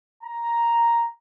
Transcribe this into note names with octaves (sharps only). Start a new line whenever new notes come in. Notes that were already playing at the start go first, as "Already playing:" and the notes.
A#5